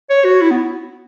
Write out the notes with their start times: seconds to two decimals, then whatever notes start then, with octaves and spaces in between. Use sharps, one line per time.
0.10 C#5
0.25 F#4
0.42 E4
0.50 B3